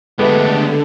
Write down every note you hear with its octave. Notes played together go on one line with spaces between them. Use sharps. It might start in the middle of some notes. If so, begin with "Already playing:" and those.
D3 G#3 A3 B3 G4 A4 B4 E5